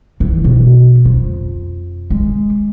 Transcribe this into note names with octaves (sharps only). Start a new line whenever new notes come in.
E3
B2
F2
G#3